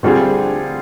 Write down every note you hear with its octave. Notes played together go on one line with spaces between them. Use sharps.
D3 G3 C4 F4 G#4